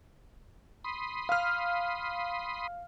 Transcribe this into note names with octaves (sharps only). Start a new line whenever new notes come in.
B5 C6 D#6
F5 F6